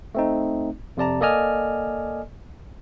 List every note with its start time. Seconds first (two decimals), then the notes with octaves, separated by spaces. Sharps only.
0.15 A3 C4 D#4
0.97 F2 C3 D5 A5 A#5
1.21 A#3 A4 D5 D#5 G#5 F6